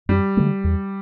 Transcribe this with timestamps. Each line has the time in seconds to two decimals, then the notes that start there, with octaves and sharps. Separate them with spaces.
0.09 F#2 G3
0.37 D3 F#3 A3
0.64 E2